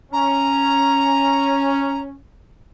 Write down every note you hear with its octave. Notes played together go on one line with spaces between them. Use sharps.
C#4 A#5